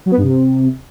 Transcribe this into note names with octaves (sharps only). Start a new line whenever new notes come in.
F#3
B3
G2
C3